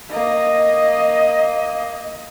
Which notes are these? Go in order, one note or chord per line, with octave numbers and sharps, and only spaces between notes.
A#3 D#5